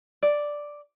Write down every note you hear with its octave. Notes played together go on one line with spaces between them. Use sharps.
D5